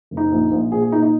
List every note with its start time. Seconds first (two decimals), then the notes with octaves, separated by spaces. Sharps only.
0.11 F#1
0.17 D#4
0.31 A#1
0.52 A#1
0.72 A#2 G#4
0.82 G#4
0.92 A#2 D#4
1.03 D#4